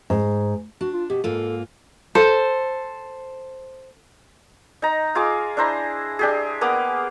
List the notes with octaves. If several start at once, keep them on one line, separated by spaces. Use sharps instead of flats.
G#2
D4 F#4
F4
B2 G4
G#2 A#3 F4 A4
A4 C5
D#4 A#5
F4 G#4 F5 D6
D4 E4 C5 A#5
D4 G4 G#4
A#3 B3 D6 D#6